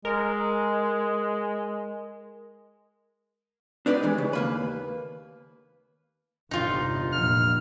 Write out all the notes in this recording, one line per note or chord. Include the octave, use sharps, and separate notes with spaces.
G#3 A#4
D4 D#4 B4 D5
C3 E3 G#3
C#3
D#2 A#3 B4
G1 E2 C3 D#4 F4
F1 A#2 F6